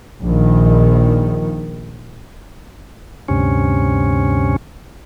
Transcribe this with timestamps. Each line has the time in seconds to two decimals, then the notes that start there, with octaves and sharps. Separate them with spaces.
0.23 A#1 D#3
3.28 D2 G2 C3 C#4